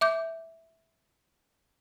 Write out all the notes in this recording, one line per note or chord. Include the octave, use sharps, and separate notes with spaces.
E5 D6 G6